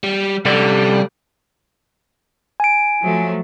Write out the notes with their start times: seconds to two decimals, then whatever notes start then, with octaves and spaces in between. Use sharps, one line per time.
0.04 G3
0.45 C3 G3 A4 D5
2.60 G#5 D7
3.01 F3 F#3 A3